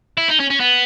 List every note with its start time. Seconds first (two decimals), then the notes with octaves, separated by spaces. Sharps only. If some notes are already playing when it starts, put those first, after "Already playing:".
0.17 E4
0.28 D#4
0.40 C#4
0.50 C#4
0.60 B3